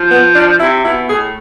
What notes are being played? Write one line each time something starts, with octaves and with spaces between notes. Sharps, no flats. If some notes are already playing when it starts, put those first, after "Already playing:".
Already playing: F3
B3
D4
C3 E4
B2 E4
A2 G#4